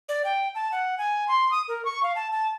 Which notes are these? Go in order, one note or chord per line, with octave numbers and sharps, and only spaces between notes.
D5
G5
A5
F#5
G#5
C6
D#6
A#4
C#6
F5
A5
A5